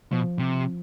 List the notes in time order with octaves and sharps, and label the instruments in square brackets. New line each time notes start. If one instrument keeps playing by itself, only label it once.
[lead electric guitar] B2 [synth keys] F3
[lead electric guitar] C3